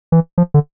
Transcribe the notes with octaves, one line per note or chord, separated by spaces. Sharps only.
E3
F3
D3